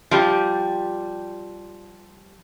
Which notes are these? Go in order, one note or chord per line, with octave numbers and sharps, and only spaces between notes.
F3 G3 G4